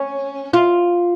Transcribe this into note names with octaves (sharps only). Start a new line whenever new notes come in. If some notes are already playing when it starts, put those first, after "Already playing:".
Already playing: C#4
F4